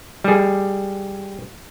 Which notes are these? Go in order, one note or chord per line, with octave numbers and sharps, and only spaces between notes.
G3 G#4